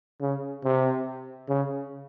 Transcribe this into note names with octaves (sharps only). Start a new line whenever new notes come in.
C#3
C3
C#3